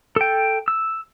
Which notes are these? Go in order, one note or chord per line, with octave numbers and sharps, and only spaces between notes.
A4 G5
E6